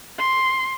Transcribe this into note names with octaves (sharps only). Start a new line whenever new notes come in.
C6